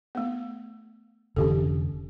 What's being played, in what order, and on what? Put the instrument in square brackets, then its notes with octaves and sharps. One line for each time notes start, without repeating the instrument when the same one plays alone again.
[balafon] A3 B3
[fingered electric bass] F1 D3 E3 [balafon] C#4 G4 A4